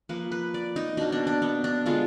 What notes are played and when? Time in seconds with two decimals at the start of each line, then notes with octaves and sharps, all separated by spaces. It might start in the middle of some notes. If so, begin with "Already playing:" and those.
0.09 F3 A#3 B4
0.32 B4
0.54 D5
0.76 D#4
0.97 B2 A#3 D4
1.12 D4
1.27 D4
1.42 B3
1.64 D4
1.86 D3 G#3 B3 F4